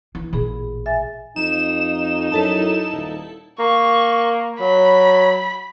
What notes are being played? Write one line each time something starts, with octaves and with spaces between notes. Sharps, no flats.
E3
A1 A#2 G#4 B5
E5 G#5 A6
F2 D#4 E7
F#2 E4 A4 A5
D#1
A#3 C#6
F#3 B5